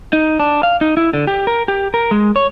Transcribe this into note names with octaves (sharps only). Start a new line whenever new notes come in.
D#4
D4
F5
D#4
E4
D3
G4
A#4
G4
A#4
G#3
C#5